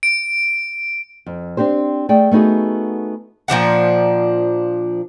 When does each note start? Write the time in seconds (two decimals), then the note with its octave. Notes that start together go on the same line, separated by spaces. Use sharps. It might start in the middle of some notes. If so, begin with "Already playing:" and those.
0.03 D7
1.26 F2
1.57 C4 D4 G4 C5
2.09 A3 G#4 D5 G5
2.31 A3 B3 D#4 F#4 G#4
3.48 A#2 F3 D4 F#5